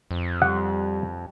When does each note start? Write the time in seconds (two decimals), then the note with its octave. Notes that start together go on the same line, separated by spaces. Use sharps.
0.11 F2
0.42 G3 F#5